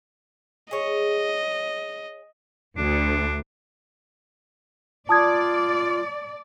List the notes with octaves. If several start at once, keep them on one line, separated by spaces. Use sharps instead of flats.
G#4 C#5 D#5
D2 D4
F4 D5 A5 D#6 G#6